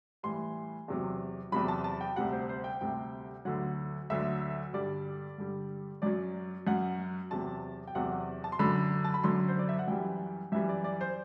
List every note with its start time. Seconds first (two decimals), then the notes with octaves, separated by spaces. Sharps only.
0.23 A2 E3 G3 C6
0.88 E2 C3 F#3
1.52 E2 C3 F#3 B5
1.68 A5
1.84 A5
2.01 G5
2.16 D2 C3 G3 F#5
2.32 C5
2.49 C5
2.64 G5
2.81 D2 C3 G3 G5
3.45 D2 D3 F#3 F#5
4.10 D2 D3 F#3 E5
4.73 G2 D3 G3 D5
5.38 G2 D3 G3
6.02 F#2 F#3 D5
6.67 F#2 F#3 F#5
7.31 E2 C3 F#3 A5
7.87 G5
7.95 E2 C3 F#3 F#5
8.11 F#5
8.44 A5
8.52 C6
8.59 F#2 D3 F#3 B5
9.04 A5
9.14 B5
9.23 F#2 D3 F#3 C6
9.49 C5
9.59 D5
9.69 E5
9.79 F#5
9.88 F#2 E3 G3 G5
10.52 F#2 E3 G3 E5
10.69 D5
10.84 D5
11.01 C5